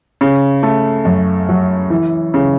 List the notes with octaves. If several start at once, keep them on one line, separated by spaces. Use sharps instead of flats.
C#3
A3
F#2
F#3
E3
C#3